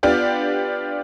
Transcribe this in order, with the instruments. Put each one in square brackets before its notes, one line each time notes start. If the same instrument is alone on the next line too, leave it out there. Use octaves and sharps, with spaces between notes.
[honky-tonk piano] B3 D4 F4 G4 D5